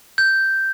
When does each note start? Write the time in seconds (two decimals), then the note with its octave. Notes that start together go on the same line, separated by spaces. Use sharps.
0.18 G6